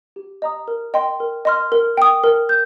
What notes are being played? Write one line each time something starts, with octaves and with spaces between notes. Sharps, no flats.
G4
D#5 A#5 D#6
A#4
D#5 G5 C6
A#4
D#5 C6 F6
A#4
G5 D#6
A#4
G6